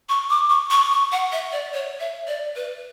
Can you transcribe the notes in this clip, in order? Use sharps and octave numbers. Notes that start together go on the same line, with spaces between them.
C#6
D6
C#6
C#6
C#6
F#5
E5
D5
C#5
E5
D5
B4